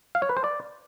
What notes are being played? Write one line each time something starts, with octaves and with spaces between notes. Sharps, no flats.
F5
C#5
B4
C5
D5